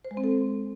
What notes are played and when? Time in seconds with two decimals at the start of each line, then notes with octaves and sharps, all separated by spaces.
0.05 C5
0.11 G#3
0.17 C4
0.24 A4